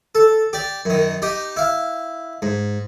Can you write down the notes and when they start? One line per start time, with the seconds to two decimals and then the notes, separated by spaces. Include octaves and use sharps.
0.15 A4
0.53 G4 D5
0.85 F#2 D#3
1.22 D#4 G4
1.56 E4 F5
2.42 G#2